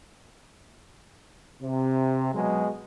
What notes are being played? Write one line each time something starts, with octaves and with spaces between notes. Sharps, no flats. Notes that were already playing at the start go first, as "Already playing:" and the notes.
C3
B2 F#3 G#3